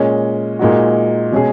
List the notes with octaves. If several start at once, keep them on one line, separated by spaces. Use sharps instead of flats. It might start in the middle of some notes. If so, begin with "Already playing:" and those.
Already playing: A#2 G#3 C#4
A#2 G#3 D#4 F#4
B2 G#3 C#4 G#4